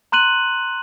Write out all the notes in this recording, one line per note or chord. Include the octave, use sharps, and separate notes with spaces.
A#5 C6 F#6 D#7 F#7